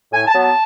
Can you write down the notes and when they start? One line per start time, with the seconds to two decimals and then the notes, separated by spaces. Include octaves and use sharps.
0.12 A2 G#5
0.27 A5
0.33 F#3 B3
0.40 A5